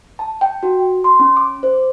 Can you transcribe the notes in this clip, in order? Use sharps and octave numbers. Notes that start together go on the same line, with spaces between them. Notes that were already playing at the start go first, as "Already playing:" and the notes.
A5
G5
F#4
C6
C#4
D6
C5